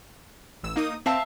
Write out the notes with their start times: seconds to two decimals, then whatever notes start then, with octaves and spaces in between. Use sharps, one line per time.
0.63 A1 E6
0.76 A#3 D#4 D#6
1.06 C4 E5 F5 A5